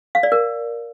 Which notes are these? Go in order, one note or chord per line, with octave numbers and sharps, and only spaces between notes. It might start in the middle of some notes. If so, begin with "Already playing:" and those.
F5
D5
A#4